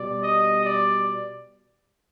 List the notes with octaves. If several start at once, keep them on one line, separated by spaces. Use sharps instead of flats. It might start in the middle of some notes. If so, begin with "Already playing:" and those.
Already playing: B2 G3 D5
D#5
D5